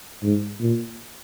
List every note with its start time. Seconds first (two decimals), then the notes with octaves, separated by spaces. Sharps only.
0.22 G#2
0.60 A#2